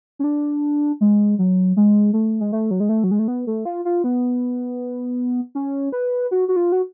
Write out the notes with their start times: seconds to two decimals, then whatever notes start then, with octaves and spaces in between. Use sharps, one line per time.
0.19 C#4
0.24 D4
1.01 G#3
1.39 F#3
1.77 G#3
2.13 A3
2.41 G#3
2.52 A3
2.71 F#3
2.80 G#3
2.89 A3
3.04 F#3
3.11 G#3
3.19 A3
3.28 B3
3.47 A3
3.65 F4
3.85 F4
4.04 B3
5.55 C#4
5.92 B4
6.31 F#4
6.48 F#4
6.56 F4
6.72 F#4